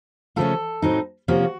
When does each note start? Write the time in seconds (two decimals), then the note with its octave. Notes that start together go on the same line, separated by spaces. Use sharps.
0.36 C#3 F3 A3 C#4 F4 A4
0.82 A2 F#3 C4 D#4
1.28 C3 F3 A#3 C#4 F#4